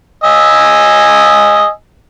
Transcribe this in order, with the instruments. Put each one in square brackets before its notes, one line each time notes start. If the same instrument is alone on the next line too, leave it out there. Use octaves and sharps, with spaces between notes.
[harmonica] D#5 G#5 E6